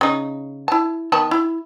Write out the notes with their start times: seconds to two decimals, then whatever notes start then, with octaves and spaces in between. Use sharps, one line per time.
0.01 C#3 D#4
0.68 E4 A5
1.12 D#3 B3 A5
1.31 E4